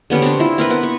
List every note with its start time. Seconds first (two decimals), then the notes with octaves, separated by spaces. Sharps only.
0.10 D3 B3 C#4 G4
0.22 C4 D4
0.39 E4 F4
0.58 C4 A#4 B4
0.70 B3
0.83 C#6